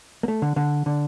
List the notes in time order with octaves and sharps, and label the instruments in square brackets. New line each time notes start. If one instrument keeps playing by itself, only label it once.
[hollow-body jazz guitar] A#3
A3
D3
D3
D3